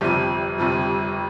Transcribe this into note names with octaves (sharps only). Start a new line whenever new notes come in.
G1 F2 C3 F3 G3 G4
G1 F2 C3 F3